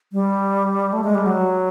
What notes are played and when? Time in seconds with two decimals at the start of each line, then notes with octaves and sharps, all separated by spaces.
0.13 G3
0.93 A3
1.04 G#3
1.15 G3
1.26 F#3